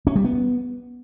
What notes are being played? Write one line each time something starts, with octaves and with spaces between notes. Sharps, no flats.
C#4
G3
B3